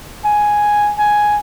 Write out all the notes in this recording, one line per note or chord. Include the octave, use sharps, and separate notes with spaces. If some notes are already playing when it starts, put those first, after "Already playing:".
G#5
G#5